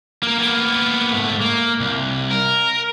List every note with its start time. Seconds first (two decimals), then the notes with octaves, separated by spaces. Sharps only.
0.23 A#3 A#4
0.39 A#3 B3
1.12 G#2 A3
1.41 A#3
1.80 C2
2.31 A#4